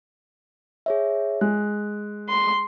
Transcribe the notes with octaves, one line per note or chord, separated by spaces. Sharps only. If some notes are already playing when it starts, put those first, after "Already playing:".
G#4 C#5 E5
G#3 F#6
C6